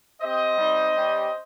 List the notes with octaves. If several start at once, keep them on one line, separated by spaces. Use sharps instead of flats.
C4 G4 C5 D#5
G3 C4 D#4
G3 C#4 G4